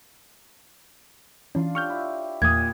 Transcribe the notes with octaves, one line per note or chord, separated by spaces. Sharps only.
E3 C#4 D4 F4
G4 C#5 D5 C#6 F6 G6
E4
E2 A#2 D#6 G#6